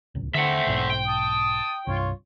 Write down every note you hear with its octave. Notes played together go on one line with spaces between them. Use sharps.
D1 C#2
D3 A3 C4 C5 E5 F#5
B1 G#2
G5
A5 D#6
C2 G2 F4 C#5